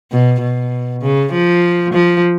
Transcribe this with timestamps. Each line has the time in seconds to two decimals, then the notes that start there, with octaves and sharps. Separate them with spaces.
0.12 B2
0.41 B2
1.02 C#3
1.33 F3
1.94 F3